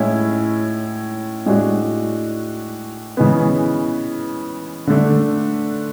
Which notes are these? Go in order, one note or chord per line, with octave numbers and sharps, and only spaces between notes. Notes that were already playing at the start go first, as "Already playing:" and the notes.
Already playing: A2 G#3 C#4 E4
A2 G#3 D4 F#4
C#3 E3 G#3 B3
D3 A3 D4